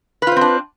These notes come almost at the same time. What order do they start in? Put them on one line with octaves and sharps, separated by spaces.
B4 F4 C5 C4 D4